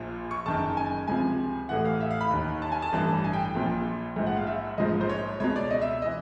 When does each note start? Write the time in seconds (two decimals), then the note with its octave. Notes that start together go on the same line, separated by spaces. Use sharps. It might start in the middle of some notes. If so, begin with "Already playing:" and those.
Already playing: A#1 A#2 F3
0.31 C#6
0.45 F#1 F#2 D#3 A5
0.77 G#5
1.07 C#2 C3 F3 G#5
1.69 A1 A2 E3 F#5
1.85 F5
2.00 E5
2.11 F5
2.21 B5
2.31 D#2 D#3
2.62 A5
2.72 G#5
2.82 A5
2.92 A1 G2 E3
3.24 G#5
3.33 G5
3.44 G5
3.55 A#1 A#2 F3
4.16 A#1 G#2 F3
4.26 F#5
4.37 F5
4.47 E5
4.78 A#1 G#2 F3 D#5
5.01 C5
5.09 C#5
5.40 C#2 B2 C#5
5.56 D5
5.71 D#5
5.82 E5
5.92 E5
6.02 E3 D#5